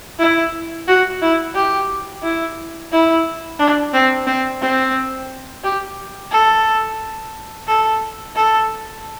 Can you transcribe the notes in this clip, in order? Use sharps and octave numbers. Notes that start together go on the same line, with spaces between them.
E4
F#4
E4
G4
E4
E4
D4
C4
C4
C4
G4
A4
A4
A4